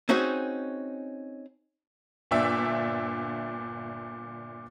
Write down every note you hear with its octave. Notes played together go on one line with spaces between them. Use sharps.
C4 C#4 D#4 F#4 G#4
G1 A#2 D4 E5 E6